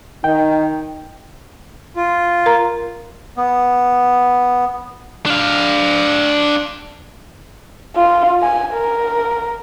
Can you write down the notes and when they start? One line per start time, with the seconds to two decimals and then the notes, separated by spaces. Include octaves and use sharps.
0.24 D#3 D#4 G5
1.96 F4
2.46 A#4 A#5
3.37 B3
5.26 D4 F5
7.96 F4
8.42 G#5
8.74 A#4